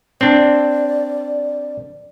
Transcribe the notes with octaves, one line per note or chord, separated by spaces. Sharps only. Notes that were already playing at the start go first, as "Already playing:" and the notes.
C4 D4 D5